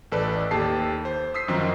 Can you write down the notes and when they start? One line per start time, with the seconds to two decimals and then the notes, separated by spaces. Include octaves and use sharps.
0.12 A1 A4 B4 D5
0.51 D#2 G4 A4 A5 C7
1.05 C5
1.34 D#6 E6 B6 C7
1.48 F#2 D#3 F3 C4 D#4